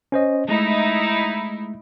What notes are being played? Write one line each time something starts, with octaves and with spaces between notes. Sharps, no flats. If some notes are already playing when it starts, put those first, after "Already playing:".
C#4 C5 D#5
G#3 A3 D#4 E4